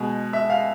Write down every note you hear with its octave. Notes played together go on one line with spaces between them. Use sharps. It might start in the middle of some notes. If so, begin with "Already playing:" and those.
Already playing: B2 G#3
E5
F5